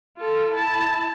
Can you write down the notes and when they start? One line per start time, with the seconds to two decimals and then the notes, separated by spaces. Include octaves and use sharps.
0.17 F4 A4
0.52 E4 A5